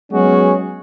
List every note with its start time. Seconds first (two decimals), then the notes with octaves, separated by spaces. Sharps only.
0.12 F#3 G#3 B3 C#4 F#4 G#4